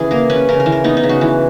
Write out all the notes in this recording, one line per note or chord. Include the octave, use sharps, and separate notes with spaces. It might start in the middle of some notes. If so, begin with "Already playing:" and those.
Already playing: C#3 E3 G#4
A#3 A#4
C#4 B4
C#3 A#4
A#4
E3
A#4
B3 D#4
D#4
C#3
F#4
E3